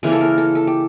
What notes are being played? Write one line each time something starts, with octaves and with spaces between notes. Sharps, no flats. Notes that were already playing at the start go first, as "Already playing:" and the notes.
C#3 E3 A#3 C#4 A#4
A4
A#4
A4
A4
G4